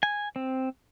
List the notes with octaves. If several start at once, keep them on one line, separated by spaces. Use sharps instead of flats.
G#5
C4